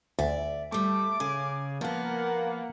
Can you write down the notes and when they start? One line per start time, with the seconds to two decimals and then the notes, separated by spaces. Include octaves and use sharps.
0.19 D2 D5 E5
0.72 G3 A3 A4 D6
1.20 C#3 G#4
1.81 F3 A#3 B3 F#5